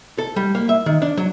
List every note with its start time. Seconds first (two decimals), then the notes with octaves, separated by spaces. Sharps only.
0.18 A4
0.36 G3
0.55 A#3
0.69 E5
0.86 D#3
1.02 D4
1.17 F#3